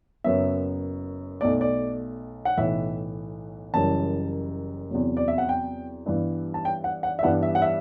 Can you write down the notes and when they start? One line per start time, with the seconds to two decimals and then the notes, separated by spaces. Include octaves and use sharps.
0.24 F#1 F#2 F#3 B3 E5
1.41 B1 B2 A3 D5
1.61 D5
2.45 F#5
2.57 B1 A2 E3 E5
3.74 F#1 F#2 E3 G3 A5
4.90 E2 C3 F#3
5.17 D5
5.28 E5
5.38 F#5
5.49 G5
6.06 G2 E3 G3 B3
6.54 A5
6.65 G5
6.84 F#5
7.03 F#5
7.19 E5
7.23 G2 E3 G3 B3 D4 F#5
7.43 E5
7.55 F#5
7.62 E5